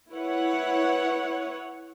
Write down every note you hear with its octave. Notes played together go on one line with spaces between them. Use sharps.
E4 B4 C#5 F#5